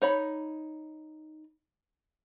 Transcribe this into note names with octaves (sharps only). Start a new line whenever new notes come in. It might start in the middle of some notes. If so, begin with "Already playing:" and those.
D#4 C#5 B5